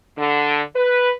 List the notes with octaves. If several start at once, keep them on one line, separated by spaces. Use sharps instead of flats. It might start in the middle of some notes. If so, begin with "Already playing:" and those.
D3
B4